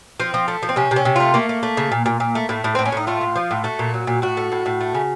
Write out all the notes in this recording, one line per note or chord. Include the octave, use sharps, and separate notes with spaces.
F3 C4
F3
A3
F3
C4
C3 C#4
C3
C#4
C3
A3 F4
A3 A#3
A3
A3
C#3
A#2
A#2
A#2
A3
A2 A3
A2
A2 C4
C#4
A2 D#4
A3 F4
A2
F3
A2
A3 F#4
A#2
F#3
A#2
A2 F#4
A3
A2
A2
A3
C#3